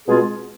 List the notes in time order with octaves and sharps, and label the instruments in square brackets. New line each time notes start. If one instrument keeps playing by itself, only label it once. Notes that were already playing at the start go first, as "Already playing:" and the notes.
[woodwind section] B2 G#3 C4 F4 G#4